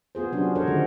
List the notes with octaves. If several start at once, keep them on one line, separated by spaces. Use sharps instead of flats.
B3 F4 G#4 C5
C3 F#3 B3 C#4 D4 F#4
F3 A4 A#4 C5 C#5
D3 D#3 G#3 C#4